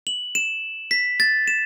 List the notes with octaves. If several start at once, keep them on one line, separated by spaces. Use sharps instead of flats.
F#7
E7
B6
A6
E7